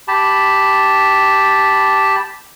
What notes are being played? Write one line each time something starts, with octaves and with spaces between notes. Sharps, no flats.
G4 A5 B5